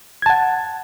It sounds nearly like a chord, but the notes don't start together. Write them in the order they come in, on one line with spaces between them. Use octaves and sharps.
G#6 A5 F#5